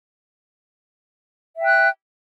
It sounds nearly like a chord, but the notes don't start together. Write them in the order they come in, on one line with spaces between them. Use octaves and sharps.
E5 G5 F#6